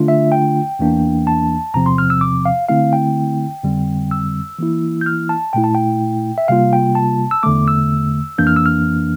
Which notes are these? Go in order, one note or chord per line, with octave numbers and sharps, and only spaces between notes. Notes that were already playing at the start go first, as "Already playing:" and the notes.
Already playing: D3 A3 D4 F4
E5
G5
E2 E3 A#3 D4
A5
E2 C3 F3 C4 A#5
C6
F6
E6
D6
F5
D3 A3 C4 E4 F5
G5
F2 D3 G3 C4
E6
E3 A#3 E4
G6
F6
A5
A#2 A3 E4 G5
A5
G5
E5
C3 G3 A#3 F4 F5
G5
A5
E6
E2 D3 A3 D6
E6
F2 E3 A#3 D4 G6
F6
E6
F6